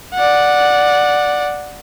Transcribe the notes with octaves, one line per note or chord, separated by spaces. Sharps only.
D5 F#5